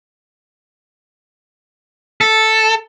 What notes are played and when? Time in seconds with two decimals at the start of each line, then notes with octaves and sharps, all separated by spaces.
2.21 A4